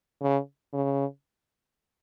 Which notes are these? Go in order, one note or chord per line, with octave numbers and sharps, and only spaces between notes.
C#3
C#3